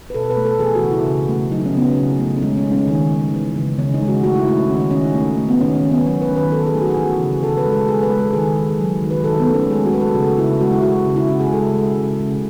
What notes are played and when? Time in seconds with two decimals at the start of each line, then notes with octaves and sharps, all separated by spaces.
0.10 B4
0.14 B2 A4
0.30 B4
0.37 A3
0.45 A4
0.60 E3 G#4
0.75 F#4
0.84 C#3
0.91 E4
1.06 C#3
1.29 A3
1.51 F#3 D#4
1.66 C#4
1.74 C#3 B3
1.82 C#4
1.97 C#3
2.20 A3
2.36 C#4
2.42 G#3 D#4
2.57 C#4
2.65 G#3
2.72 C#4
2.87 D#3
3.11 D#3
3.34 E3
3.56 C#3
3.78 C#3 C#4
3.94 D#4
4.02 G#3
4.08 F#4
4.24 A3 F#4
4.36 E4
4.47 A3 E4
4.58 D#4
4.69 D#3 C#4
4.80 D#4
4.91 D#3 C#4
5.15 A3
5.38 A3
5.49 B3
5.61 D#3 C#4
5.75 C#4
5.83 D#3
5.91 B3
6.07 F#3 C#4
6.22 B4
6.29 D#3
6.36 B4
6.51 D#3 A4
6.67 G#4
6.74 A3
6.82 F#4
6.91 G#4
6.97 E3 F#4
7.20 C#3
7.43 C#3 A4
7.57 B4
7.66 G#3
7.73 A4
7.88 G#3 G#4
8.03 B4
8.10 G#3
8.18 A4
8.33 D#3 G#4
8.56 D#3
8.79 F#3
9.02 D#3
9.11 B4
9.24 D#3 A4
9.40 B3
9.48 A3
9.54 C#4
9.69 G#3 G#4
9.86 F#4
9.93 G#3 B4
10.00 A4
10.15 C#3 F#4
10.38 C#3 E4
10.60 G#3 F#4
10.72 E4
10.82 G#3 F#4
11.06 C#3
11.16 E4
11.28 C#3 F#4
11.40 G#4
11.52 G#3 A4
11.74 G#3
11.97 C#3
12.20 C#3